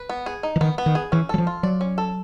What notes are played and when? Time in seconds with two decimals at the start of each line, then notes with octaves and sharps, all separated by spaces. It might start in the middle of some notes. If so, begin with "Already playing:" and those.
Already playing: B4
0.09 B3
0.26 G#4
0.43 D#4
0.56 E3
0.61 D#3 B3
0.78 B3
0.86 D#3
0.95 G#4
1.12 E3 C#4
1.29 F#3 A4
1.38 F3
1.47 F4
1.63 F#3 D5
1.81 C#4
1.98 A4